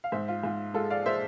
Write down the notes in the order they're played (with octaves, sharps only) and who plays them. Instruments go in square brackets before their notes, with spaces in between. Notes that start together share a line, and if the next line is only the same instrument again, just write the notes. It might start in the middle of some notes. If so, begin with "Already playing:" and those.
[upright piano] F5
G#2 C5 E5
F4
G#2 F4
G#3 F4 A4
D5 F5
G#3 C5 E5